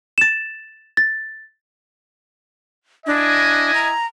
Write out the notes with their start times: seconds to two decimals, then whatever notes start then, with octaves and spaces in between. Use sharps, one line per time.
0.18 A6 E7
0.97 A6
3.07 D4 E4 D#5 G#5
3.74 A#5